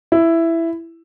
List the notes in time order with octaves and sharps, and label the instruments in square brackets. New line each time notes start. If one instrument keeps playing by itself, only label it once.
[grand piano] E4